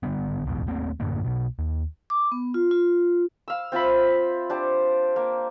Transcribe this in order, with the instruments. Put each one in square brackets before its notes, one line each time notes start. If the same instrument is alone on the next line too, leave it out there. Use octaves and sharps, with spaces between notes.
[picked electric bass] G#1 D3 G3 B3
D1 B1 E2
D#2 A3 A#3 C4
F#2 A2 D3 A#3
B1 B2
D#2
[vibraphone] D6
B3
F4
F4
[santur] F5 E6
C4 F4 E5 B5
D4 G4 C5
A#3